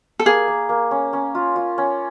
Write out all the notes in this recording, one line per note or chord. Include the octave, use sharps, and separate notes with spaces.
A4
A#3 G#4
A#3
A#3
C#4
C#4
F4
F4
C#4